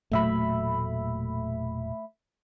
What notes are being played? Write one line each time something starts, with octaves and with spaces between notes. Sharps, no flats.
E1 A#2 F#3 A3 E5 B5